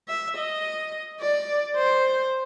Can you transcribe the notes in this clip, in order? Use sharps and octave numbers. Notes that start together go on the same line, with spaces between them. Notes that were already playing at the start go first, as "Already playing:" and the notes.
E5
D#5
D5
C5